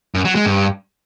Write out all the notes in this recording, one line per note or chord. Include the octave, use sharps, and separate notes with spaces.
F#2
F#3
G#3
G2